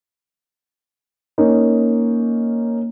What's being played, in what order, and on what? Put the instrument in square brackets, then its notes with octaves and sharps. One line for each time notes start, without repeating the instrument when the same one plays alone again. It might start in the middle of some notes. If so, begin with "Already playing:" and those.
[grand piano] A#3 C#4 D#4